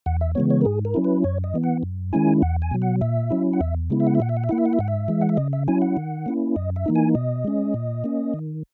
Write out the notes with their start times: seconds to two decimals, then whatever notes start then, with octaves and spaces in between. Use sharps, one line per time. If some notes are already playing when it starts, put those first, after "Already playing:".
0.06 E2 F#5
0.21 E5
0.35 C#3 E3 G#3 B3 C#5
0.50 C#5
0.61 A#4
0.65 G#2 G#4
0.85 A#4
0.94 F#3 C#4 E4
1.04 B4
1.24 F#2 C#5
1.44 D#5
1.54 E3 B3
1.64 F#5
1.83 F#2
2.13 D#3 G#3 C#4 E4 G#5
2.42 E2 F#5
2.62 G#5
2.71 B2 F#3
2.82 F#5
3.01 A#2 E5
3.30 F#3 C#4 E4
3.53 F#5
3.61 E2 E5
3.90 C#3 G#3 B3 E4
4.00 E5
4.07 F#5
4.15 E5
4.20 A#2 F#5
4.29 E5
4.37 F#5
4.44 E5
4.49 A#3 E4 F#5
4.58 E5
4.65 F#5
4.73 E5
4.79 G#2 F#5
4.88 E5
5.08 E3 G#3
5.21 F#5
5.29 E5
5.37 C#3 D#5
5.53 E5
5.68 F#3 C#4 E4 G#5
5.82 F#5
5.97 D#3
6.26 A#3 C#4 E4
6.56 F#2 D#5
6.76 E5
6.86 E3 A#3 D#4
6.96 G#5
7.15 B2 D#5
7.45 G#3 C#4
7.74 A#2
8.04 A#3 C#4
8.34 D#3